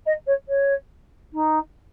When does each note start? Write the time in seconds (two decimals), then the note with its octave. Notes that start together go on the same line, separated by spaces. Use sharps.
0.06 D#5
0.26 C#5
0.48 C#5
1.33 D#4